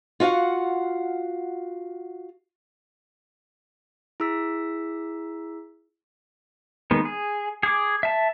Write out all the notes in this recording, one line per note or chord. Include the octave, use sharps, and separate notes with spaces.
F4 F#4 F5 F#5
E4 G#4 E6 B6
D#3 G#3 B3
G#4
G#4 D6
E5 A5